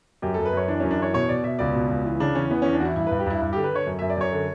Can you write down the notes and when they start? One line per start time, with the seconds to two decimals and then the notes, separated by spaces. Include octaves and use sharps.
0.22 F#2 G4
0.34 F#2 A4
0.45 B4
0.53 F#2 C#5
0.68 E3 D4
0.80 F#2 C#4
0.91 D4
0.99 E3 C#5
1.14 B2 C#5
1.29 B2 D5
1.44 B2 E5
1.59 C#2 D5
1.74 B2
1.89 C#2
2.05 E3
2.20 C#3 D4
2.35 E2 C#4
2.50 E3 B3
2.62 E2 C#4
2.73 D4
2.80 E2 E4 F#4
2.95 G2 E4
3.07 G2 B4
3.19 G4
3.26 G2 E4
3.42 G2
3.53 D3 G4
3.64 B4
3.72 D3 C#5
3.86 F#2
3.99 F#2 E5
4.10 D5
4.17 F#2 C#5
4.32 D3